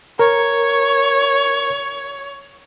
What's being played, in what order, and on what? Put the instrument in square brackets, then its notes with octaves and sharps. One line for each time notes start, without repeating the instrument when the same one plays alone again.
[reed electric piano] A#4 [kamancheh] C#5